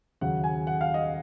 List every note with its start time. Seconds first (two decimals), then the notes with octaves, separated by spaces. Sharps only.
0.21 D#2 C#3 F#3 F#5
0.44 G#5
0.67 F#5
0.81 F5
0.94 D#5